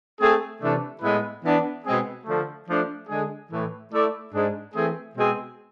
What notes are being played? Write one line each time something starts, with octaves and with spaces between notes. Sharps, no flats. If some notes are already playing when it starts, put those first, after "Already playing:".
A3 C4 G#4
C3 E3 A3 D4 A4
A2 G#3 B3 E4 B4
E3 B3 D4
B2 G#3 C4 G#4
D3 F3 A3
F3 A3 D4
D3 G#3 D4 G#4
A2 E3 A3
A3 E4 A4 D5
G#2 G#3 D4 G#4
E3 A3 C4 G#4
B2 G#3 C4 G#4